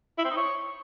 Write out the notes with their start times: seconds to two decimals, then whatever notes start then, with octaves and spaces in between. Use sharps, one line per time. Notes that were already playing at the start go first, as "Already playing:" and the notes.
0.18 E4
0.24 C4
0.31 D#4
0.37 C#5